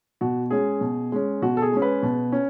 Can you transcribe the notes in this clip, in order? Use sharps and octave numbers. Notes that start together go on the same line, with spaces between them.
B2 F#4
G#3 C#4 G#4
B2
G#3 C#4
B2 F#4
A4
G#4
G#3 C#4
B4
B2
C#4